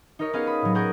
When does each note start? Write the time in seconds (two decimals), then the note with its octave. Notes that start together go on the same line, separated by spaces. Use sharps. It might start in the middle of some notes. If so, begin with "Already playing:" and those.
0.19 D#4 G4 A#4 C#5 D#5
0.33 B3 C#4 G4 G#4 D#5 F5
0.47 B5 D#6
0.62 A2 F#3
0.75 G#4 A#4 F#5 C#6 D#6 G6